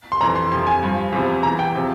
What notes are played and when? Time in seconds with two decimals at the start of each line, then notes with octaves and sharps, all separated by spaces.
0.12 C6
0.20 F2 E3 A#5
0.36 C6
0.51 F2 C3 F3 C6
0.67 G#5
0.83 G2 F3
1.12 E2 C3 F3
1.43 E2 E3 A#5
1.59 G5
1.75 C3 F3